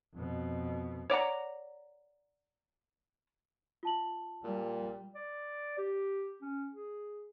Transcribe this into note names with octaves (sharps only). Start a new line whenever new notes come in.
F2 B2
C#5 D5 F#5 A#5
F4 A5 F#7
A#2 G3
D5
G4
C#4
G#4